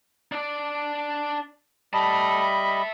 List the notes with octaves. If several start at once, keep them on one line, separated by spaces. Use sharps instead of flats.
D4 D5
G3 D#5 E5 A5 B5